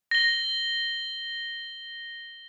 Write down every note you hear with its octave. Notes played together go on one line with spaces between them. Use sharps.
A#6 G7